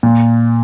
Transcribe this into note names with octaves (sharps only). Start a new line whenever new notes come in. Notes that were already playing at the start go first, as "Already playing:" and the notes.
A#2